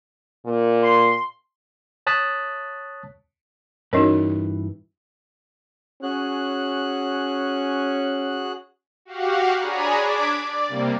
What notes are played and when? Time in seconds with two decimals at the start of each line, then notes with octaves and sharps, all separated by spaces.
0.46 A#2
0.83 C6
2.07 C#5 A5 D#6 F#6 A6 B6
3.93 G2 E3 C#4 D#4 F#4 A#4 C#5 D#5
6.03 C#4 F#4 G#4 F#6
9.05 F#4 G4 F5 F#5
9.58 D4 G#4 C#5 G#5 A#5 B5
9.97 D4 D6 G#6 B6 D7
10.36 D5
10.68 C3 G3 A#3